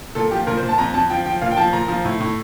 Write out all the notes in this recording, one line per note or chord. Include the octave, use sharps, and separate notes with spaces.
A#2 A4
F3 G4
A#2 A#4
C5
A#2
A5
F2 A#5
F2 A5
F3 G5
F3 G5
A#2 F5
G5
F3 A5
A#2 A#5
F3
A2
A2